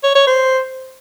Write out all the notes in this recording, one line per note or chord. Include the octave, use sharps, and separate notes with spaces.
C#5
C#5
C5